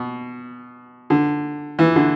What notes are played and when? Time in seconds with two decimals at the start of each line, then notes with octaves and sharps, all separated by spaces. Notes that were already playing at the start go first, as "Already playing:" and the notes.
Already playing: B2
1.10 D3
1.79 E3
1.96 D3